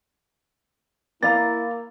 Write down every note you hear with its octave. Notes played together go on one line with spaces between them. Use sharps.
A#3 E4 D5 F5 A#5 A6